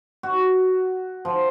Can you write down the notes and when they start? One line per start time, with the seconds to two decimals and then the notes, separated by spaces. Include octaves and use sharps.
0.23 F#4
1.25 F3